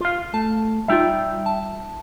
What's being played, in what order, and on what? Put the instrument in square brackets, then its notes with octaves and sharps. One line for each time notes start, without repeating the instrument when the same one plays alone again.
[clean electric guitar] F4 F5
[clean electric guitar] A3 [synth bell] A5
[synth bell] G3 D#4 F4 [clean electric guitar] E5 G5
[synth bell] A5